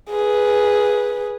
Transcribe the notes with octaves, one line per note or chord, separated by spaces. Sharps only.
G#4 B4